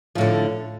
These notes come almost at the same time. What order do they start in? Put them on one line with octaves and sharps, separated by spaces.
F3 A2 D3